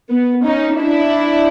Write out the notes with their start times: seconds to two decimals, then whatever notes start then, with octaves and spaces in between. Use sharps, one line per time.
0.11 B3
0.45 C#4 D#4
0.78 D4 E4